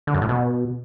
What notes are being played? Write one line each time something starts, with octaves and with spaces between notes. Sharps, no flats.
D3
F#2
A2
B2